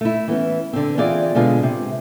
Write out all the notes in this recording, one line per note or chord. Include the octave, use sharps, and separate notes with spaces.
A3 E4
E3 B3 C#4
D3 C4
E3 C4 F4 G#4 D5
B2 D3 G#3 F4 G#4
C3